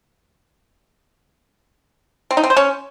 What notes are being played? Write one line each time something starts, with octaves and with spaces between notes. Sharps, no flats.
C4
D#4
C4
C5
C#4